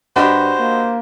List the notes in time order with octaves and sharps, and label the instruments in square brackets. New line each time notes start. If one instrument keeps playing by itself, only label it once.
[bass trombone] G2 [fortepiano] D4 G4 [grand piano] F#4 D#5 B5 [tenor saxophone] C5
[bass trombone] A#3